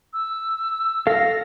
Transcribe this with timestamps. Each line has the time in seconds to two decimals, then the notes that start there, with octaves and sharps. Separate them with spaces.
0.13 E6
1.07 A4 F5 A#6